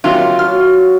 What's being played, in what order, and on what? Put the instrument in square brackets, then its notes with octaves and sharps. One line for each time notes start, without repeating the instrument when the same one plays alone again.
[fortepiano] C3 D#3 F#3 [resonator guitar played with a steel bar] F4
[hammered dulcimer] F#3 [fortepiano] F6